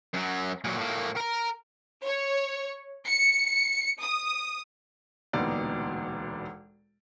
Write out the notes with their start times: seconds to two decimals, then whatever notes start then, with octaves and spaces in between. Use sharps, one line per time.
0.14 F#2 F#3
0.64 A#2 F#3
0.78 A2 A#3
1.17 A#4 A#5
2.05 C#5
3.06 C#7
4.01 D#6
5.33 E1 D2 A#2 B3 D#4 D5